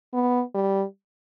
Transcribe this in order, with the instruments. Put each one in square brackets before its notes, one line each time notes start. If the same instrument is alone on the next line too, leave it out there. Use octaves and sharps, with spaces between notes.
[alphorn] B3
G3